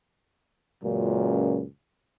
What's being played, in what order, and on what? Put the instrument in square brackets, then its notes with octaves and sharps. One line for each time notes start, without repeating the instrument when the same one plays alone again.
[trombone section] C#2 F#2 A#2